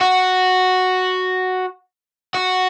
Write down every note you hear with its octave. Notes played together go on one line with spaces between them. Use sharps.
F#4
F#4